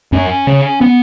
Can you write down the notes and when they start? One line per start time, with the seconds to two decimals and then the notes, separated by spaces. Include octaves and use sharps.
0.12 F#2 C#4
0.47 C#3
0.81 B3